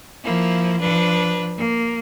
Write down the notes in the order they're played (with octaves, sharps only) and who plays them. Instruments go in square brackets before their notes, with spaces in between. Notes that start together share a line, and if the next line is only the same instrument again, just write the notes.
[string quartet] F3 A#3 E4
F3 D4 B4
A#3